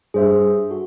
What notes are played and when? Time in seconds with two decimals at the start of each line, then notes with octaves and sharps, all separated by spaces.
0.14 G2 G#4 C5 E5
0.70 F#4 A4